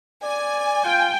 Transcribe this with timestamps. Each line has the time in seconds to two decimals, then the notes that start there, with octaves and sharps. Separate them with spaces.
0.23 D5 G#5
0.85 F4 G5